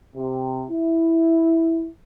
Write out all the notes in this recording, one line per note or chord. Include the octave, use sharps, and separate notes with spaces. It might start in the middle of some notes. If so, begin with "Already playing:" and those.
C3
E4